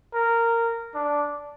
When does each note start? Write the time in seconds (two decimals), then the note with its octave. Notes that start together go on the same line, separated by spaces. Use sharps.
0.14 A#4
0.95 D4